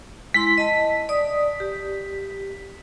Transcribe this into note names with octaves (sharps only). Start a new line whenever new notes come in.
G#3 E4 C6 B6
D#5 A5
D5 D#6
G4